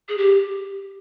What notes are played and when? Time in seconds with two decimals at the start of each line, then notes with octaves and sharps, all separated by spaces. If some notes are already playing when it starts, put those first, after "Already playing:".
0.09 G#4
0.18 G4